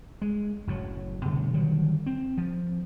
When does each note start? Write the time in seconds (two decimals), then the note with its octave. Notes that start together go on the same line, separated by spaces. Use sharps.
0.22 G#3
0.67 F#1 A2 F#3
1.25 B2 D3 G3 A3
1.53 D3 D#3 F#3 G3
2.06 C4
2.38 F3